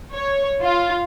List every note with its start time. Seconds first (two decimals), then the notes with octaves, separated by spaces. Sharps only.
0.13 C#5
0.63 F4